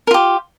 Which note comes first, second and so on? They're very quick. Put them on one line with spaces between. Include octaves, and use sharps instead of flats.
A#4 F4 G4